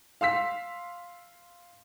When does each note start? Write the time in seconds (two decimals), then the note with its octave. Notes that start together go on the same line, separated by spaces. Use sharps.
0.21 F5 C6 E6 B6